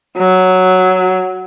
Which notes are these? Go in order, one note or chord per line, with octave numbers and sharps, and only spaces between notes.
F#3